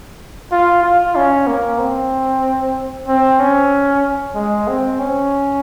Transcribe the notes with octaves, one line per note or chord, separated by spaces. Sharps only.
F4
F4
C#4
A#3
C4
C4
C#4
G#3
C4
C#4